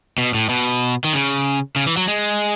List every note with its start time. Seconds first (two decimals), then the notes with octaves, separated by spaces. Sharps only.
0.18 B2
0.34 A2
0.49 B2
1.04 D#3
1.13 C#3
1.76 C#3
1.86 E3
1.97 F#3
2.08 G#3